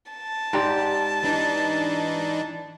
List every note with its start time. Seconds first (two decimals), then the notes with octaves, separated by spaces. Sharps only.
0.12 A5
0.53 G#2 G4 D5
1.23 E3 D4 D#4